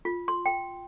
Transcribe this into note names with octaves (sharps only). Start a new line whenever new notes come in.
F4
C6
G5